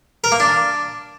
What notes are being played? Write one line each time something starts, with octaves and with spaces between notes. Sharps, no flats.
A#4
A#3
D4